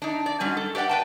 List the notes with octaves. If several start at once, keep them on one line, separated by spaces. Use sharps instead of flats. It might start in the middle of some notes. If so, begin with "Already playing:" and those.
D4 D#4
D5
G#2 F#3 G3 C#4 G#5
A4
G4 B4 D5 F#5 G5
B4 G5 A5